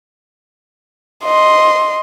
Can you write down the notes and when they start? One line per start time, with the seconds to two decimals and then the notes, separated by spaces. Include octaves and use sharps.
1.24 D#5 C6